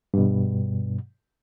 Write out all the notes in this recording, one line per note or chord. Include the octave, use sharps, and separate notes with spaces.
G2 B2